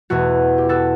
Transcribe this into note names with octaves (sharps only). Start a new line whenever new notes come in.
E2 B2 A3 F#4
G4
F#4 A4